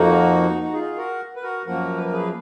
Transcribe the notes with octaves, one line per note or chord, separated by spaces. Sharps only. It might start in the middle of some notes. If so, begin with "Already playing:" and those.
Already playing: F2 F3 A#3 D#4 F#4
F#4
F4 G#4
F#4 A#4
B4
F#4 A#4
F#2 F3 A#3 F#4 A#4
B4
A#4
G#4 B4